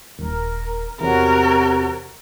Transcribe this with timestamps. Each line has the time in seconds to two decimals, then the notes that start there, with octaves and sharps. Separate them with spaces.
0.19 D#1 A#4
1.01 E2 C3 F#4 A#4 C#5